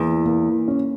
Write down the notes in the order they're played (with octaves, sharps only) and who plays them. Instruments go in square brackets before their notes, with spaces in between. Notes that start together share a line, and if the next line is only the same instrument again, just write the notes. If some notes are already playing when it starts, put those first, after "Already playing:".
Already playing: [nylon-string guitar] E2 [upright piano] A#3
[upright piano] A#3
C#4